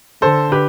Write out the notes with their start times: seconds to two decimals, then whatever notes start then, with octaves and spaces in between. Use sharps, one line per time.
0.22 D3 A4 C5
0.52 G4 B4